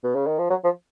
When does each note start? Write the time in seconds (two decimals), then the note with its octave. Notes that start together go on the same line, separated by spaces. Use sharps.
0.03 B2
0.15 C#3
0.27 D#3
0.38 F3
0.50 F#3
0.64 F3